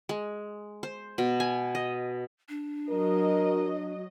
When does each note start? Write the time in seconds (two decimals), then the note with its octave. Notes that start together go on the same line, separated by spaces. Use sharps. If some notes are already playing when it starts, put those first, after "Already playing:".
0.09 G#3
0.83 C5
1.18 B2
1.40 G#5
1.75 D#5
2.49 D4
2.90 F#3 A#4 D#5